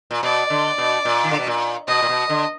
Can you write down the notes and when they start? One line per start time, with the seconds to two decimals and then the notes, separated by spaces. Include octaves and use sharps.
0.11 A#2
0.23 B2 D5
0.50 D3
0.78 B2
1.05 A#2
1.24 D#3
1.31 D3
1.39 B2
1.47 A#2
1.88 B2 D#5
2.02 A#2
2.09 B2
2.29 D3